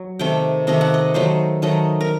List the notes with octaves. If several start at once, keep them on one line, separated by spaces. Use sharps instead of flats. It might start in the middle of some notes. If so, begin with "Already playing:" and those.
Already playing: F#3
C3 D#3 A3 G5
C3 D#3 A3 D#5
F#5
D#5
D#3 F#3 A3 C5
D#3 F#3 A3 D#5
A#4